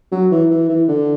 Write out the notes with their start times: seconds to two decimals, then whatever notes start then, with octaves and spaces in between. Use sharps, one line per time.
0.12 F#3
0.31 E3
0.50 E3
0.69 E3
0.88 D3